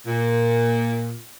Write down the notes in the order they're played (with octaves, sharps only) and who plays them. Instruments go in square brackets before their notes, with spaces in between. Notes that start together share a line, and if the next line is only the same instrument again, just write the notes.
[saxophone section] A#2